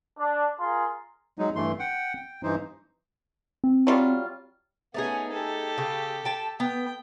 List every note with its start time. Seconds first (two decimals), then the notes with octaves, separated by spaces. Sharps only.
0.18 D4
0.59 F4 G#4 A#4 C6
1.39 F#3 G#3 D#4
1.56 G2 E3 A3 C6
1.79 F#5 G5
2.17 G5
2.43 G2 E3 D#4 C5
3.64 C4
3.87 F#3 G3 F4
4.94 A3 B3 C#4 D#4 G#4
5.32 G4 A4
5.78 C#3
6.25 G5 A5
6.60 B3 G5